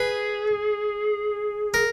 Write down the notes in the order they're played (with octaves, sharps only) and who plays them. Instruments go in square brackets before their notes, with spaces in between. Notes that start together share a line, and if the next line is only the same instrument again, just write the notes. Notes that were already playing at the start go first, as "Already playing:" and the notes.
Already playing: [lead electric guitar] G#4 [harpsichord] B4
[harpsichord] A#4